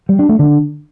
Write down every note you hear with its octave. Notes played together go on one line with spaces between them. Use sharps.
G3
D4
A3
D3